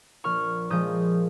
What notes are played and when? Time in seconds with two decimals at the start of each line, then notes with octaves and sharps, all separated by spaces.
0.24 A#1 C#6 F6
0.70 A#2 F3 G#3 D#6 G6